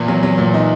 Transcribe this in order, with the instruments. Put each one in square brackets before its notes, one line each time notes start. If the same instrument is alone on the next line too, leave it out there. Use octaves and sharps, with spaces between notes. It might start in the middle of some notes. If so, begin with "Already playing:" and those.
Already playing: [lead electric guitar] E2 [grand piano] A#2
[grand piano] F#3
F#3
A#2
D#4